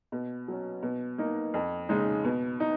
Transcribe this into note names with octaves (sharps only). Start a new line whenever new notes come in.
B2
F#3 C#4
B2
A#3 D#4
F2
C#3 G#3 D#4
B2
D#4